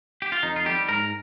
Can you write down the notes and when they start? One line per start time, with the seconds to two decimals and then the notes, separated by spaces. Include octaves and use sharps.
0.22 G4
0.32 F4
0.43 F2 D#4
0.56 F4
0.66 D#3 G3 G4
0.89 G#2 A#4